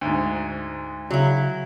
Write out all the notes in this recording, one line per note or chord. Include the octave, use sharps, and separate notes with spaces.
D2 G#2
C#3 F#3 E4